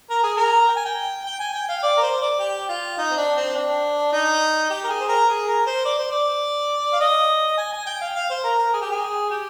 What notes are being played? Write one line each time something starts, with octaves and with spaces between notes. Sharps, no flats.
A#4
G#4
A#4
G5
G#5
G5
G5
G#5
G5
F5
D5
A#4
C5
D5
G4
F4
D#4
C4
D4
C4
D4
D#4
G4
A#4
G#4
C5
A#4
G#4
A#4
C5
D5
C5
D5
F5
D#5
G#5
G#5
G5
F5
F5
C5
A#4
A#4
G#4
G4
G#4
G4